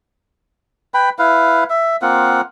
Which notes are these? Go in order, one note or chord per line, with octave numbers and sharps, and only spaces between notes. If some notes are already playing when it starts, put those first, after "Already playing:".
B4 G5 B5
E4 B4 F5
E5
A#3 C4 F4 F#5